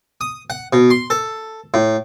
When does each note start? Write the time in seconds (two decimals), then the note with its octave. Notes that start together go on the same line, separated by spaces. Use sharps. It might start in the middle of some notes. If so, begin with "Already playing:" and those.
0.21 D#6
0.50 F#5
0.73 B2
0.90 C6
1.10 A4
1.74 A2